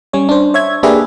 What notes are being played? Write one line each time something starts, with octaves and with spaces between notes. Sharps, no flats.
G3 C#4 C#5
D4 C5
C#5 E5 G#6
A#3 D4 G4 G#4 B4 E5